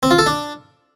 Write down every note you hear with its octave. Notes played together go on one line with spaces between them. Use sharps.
C4
F4
A4
D4